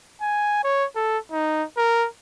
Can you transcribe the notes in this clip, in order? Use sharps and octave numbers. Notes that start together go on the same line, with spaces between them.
G#5
C#5
A4
D#4
A#4